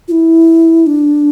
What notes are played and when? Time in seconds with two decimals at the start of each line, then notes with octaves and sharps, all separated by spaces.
0.08 F4
0.11 E4
0.87 D4